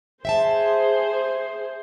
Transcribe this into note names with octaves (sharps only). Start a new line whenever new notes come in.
G#4 C5 E5 G5 A5